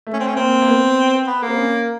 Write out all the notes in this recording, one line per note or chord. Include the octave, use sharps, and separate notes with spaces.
A3
C#4
C4
C#4
A#3 C4
A#3
B3
B3
A#3
C4
C#4